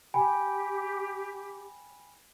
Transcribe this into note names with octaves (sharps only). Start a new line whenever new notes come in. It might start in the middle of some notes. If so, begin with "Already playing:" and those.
G4 G5 G#5 B5